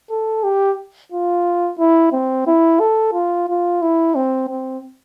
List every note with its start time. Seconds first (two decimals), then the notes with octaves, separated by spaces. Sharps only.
0.10 A4
0.44 G4
1.12 F4
1.78 E4
2.12 C4
2.47 E4
2.80 A4
3.13 F4
3.48 F4
3.82 E4
4.15 C4
4.49 C4